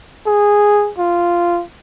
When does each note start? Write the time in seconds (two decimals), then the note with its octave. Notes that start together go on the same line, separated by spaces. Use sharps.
0.26 G#4
0.98 F4